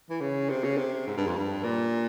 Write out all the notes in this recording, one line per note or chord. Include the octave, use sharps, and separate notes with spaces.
E3
C#3
C3
C#3
C3
G#2
G2
F2
G2
A#2